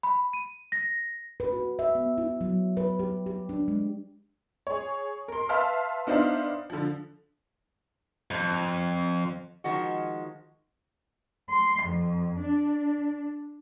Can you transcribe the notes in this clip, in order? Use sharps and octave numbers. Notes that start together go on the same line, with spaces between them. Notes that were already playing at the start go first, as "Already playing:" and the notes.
B5
D#7
A#6
B4
F#4
E5
B3
E4
F#3
B4
G4
G4
D4
G#3
G#4 C#5
A#4 C6
B4 E5 F5 A5 C6 F6
B3 D4 D#4 C5 E5 F5
D3 F3
F2
D#3 F3 G#3 F#4
C6
F2
D4